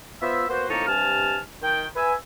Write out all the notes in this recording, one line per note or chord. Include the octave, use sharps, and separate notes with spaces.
B3 F4 C5 E5
A#3 B3 F#4 C5
F2 A2 A#3 D#4 C#5 A5
G2 C3 G#5 A5 F6
D#3 G5
B4 E5 G#5